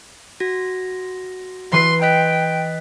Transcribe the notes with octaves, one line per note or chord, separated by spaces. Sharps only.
F#4 A#6
E3 B4 C6 C7
D#5 G5 F#6 B6